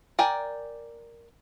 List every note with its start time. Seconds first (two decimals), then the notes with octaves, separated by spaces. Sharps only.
0.19 A#4 D5 G5 G#5